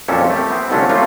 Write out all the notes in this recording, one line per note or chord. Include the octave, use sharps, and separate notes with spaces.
F2 A#2 F#3 C#4 A4 E5
A3 C4 G4
B3 C4
C2 D3 F3 A3 C#4 D4
F#3 G3 A3 A#3 F4